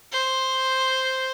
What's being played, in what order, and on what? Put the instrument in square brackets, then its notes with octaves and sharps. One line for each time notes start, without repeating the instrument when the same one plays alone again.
[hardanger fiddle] C5